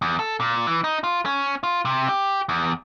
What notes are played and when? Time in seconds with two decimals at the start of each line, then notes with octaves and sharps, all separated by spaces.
0.02 E2
0.19 A4
0.40 A#2
0.67 E3
0.84 D#4
1.04 F4
1.26 C#4
1.63 F4
1.85 C3
2.09 G4
2.49 E2